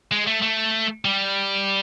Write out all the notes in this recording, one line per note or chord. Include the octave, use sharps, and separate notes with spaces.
G#3
A3
A3
G3